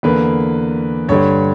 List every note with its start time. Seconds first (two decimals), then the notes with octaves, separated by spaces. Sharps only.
0.03 E2 D3 A#3 B4
1.09 G2 D3 G3 C#5